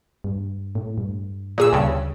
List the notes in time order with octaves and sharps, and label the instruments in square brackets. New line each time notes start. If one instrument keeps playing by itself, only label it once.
[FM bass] G2
A2
G2
[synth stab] A#2 G#4 E6
[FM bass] D2 [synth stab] G2 C#3